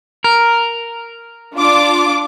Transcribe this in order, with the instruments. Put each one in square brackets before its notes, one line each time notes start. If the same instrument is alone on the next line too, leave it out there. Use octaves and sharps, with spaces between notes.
[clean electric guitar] A#4
[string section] D4 F4 D6